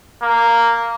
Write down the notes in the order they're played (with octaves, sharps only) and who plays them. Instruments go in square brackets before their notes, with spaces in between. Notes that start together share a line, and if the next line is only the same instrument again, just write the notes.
[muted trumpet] A#3